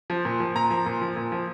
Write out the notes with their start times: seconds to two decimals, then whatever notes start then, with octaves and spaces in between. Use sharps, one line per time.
0.10 F3
0.25 A#2
0.40 F3
0.56 A#2 A#5
0.70 F3
0.86 A#2
1.01 F3
1.16 A#2
1.32 F3